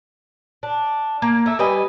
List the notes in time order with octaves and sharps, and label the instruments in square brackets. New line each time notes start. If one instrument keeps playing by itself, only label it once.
[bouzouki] D4
A#3
A3 E5
G3 B4 D#5 G#5